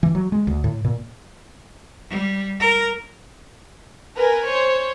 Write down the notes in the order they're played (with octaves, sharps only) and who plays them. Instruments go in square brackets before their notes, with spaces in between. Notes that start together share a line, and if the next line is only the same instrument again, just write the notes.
[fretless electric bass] E3
F#3
G#3
D2
A2
A#2
[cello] G3
A#4
[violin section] A#4 B4 G#5
C5 C#5